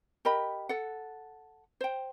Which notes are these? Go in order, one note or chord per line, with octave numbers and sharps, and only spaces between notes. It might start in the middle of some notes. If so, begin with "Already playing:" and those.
G4 A#4 D#5 B5
A4 F#5
C5 G5